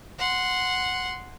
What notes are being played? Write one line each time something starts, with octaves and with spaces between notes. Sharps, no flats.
F#5 C6